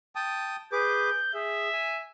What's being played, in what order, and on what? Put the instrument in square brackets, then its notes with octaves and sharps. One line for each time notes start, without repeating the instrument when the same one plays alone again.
[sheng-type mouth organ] G5 A5 D#6
[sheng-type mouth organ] G#4 B4 D6 [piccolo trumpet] G6
[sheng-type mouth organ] G#4 [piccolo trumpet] E5
[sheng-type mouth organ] G#5